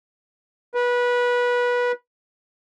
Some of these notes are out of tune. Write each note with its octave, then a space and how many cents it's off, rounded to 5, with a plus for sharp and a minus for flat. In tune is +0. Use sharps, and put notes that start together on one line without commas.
B4 -20